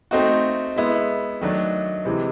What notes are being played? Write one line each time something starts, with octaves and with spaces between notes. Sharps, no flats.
A3 C4 D#4 F#4
G#3 B3 E4
D#3 F#3 A3 D4
C3 E3 G#3